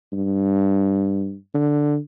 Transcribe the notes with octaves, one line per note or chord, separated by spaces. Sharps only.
G2
D3